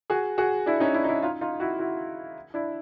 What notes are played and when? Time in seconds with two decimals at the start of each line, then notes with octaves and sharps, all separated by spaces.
0.10 F#4 G#4
0.38 F#4 G#4
0.66 D4 E4
0.80 C#4 D#4
0.94 D4 E4
1.04 D#4
1.09 D4 E4
1.22 D#4 F4
1.41 D#4 F4
1.60 E4 F#4
1.79 E4 F#4
2.54 D4 E4